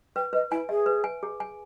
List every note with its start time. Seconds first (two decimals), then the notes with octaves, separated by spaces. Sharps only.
0.16 B4 G5
0.33 B4 D#5
0.51 E4 G#5
0.69 G#4 E5
0.86 B4
1.04 G#5
1.23 G#4
1.40 G#5